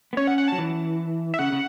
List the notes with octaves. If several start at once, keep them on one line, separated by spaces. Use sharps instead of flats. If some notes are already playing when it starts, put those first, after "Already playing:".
B3
C#4 C#5
F#5
F#5
F#3 A5
E3
E5
C#3 F#5
C#3